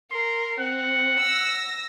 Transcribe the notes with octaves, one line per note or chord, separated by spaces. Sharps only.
A#4 C6
C4 F#5
E6 A#6